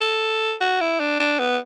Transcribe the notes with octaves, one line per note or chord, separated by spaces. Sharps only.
A4
F#4
E4
D4
D4
B3